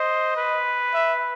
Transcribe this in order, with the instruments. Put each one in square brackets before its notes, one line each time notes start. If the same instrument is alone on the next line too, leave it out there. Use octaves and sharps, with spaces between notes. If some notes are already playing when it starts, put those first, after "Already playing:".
Already playing: [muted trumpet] C5 [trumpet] D#5
[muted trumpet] B4
[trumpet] E5